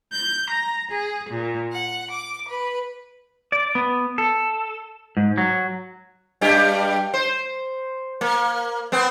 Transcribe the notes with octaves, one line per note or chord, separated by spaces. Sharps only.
G6
A#5
G#4
A#2
F#5
D6
B4
D5
B3
A4
G#2
F#3
G2 G3 G4
C5
A#3
B3 C4